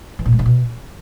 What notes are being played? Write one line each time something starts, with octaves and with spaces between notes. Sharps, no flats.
E3
A#2
G#3
C3
B2